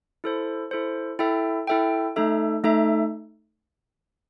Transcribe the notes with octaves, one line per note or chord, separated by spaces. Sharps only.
E4 A4 C5
E4 A4 C5
E4 A4 E5 G5
E4 A4 E5 G5
A3 D#4 A4 E5
A3 D#4 A4 E5